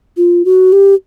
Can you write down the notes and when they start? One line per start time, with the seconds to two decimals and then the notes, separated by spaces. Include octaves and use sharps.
0.17 F4
0.45 F#4
0.72 G4